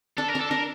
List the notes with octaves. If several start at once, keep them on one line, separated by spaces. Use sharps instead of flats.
D4 A4
A#4
D4
A4
D4 A#4